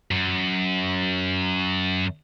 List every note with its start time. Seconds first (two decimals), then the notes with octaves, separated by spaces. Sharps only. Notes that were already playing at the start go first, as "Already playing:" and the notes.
0.11 F#2